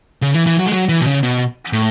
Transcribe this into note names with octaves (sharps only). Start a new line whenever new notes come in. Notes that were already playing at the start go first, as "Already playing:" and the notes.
C#3
E3
E3
F#3
G#3
F#3
E3
B2
C#3
B2
A2